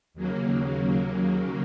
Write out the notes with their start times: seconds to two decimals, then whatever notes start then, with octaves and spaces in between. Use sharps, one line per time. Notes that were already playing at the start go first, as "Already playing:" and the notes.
0.14 D#2 C#3 F#3 A#3